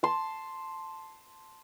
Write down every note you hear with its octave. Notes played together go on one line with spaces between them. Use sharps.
A5 C6